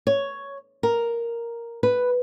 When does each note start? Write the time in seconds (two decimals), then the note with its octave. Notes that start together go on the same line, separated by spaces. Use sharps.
0.07 C#5
0.83 A#4
1.83 B4